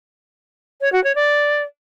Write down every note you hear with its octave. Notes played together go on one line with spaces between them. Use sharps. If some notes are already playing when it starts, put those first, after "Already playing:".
C#5
F#4
C#5
D5